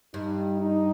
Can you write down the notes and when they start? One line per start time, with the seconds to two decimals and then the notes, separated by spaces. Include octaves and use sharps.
0.14 G2 D#4
0.61 D#4